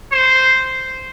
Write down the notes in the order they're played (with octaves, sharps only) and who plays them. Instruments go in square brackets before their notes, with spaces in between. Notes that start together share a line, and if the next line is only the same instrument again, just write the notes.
[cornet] C5